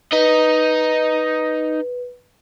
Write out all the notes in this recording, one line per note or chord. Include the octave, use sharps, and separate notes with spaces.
D#4 B4 D#5